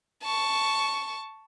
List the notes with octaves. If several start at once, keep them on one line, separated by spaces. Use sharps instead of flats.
A5 C#6